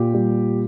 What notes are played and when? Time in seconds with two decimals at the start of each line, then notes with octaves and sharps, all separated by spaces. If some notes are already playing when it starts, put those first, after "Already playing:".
Already playing: A#2 G4
0.14 G3